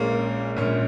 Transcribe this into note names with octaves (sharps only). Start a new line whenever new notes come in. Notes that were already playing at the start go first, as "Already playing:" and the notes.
Already playing: A#1 A#2 G#3 A#3 C#4
A#1 A#2 G#3 C#4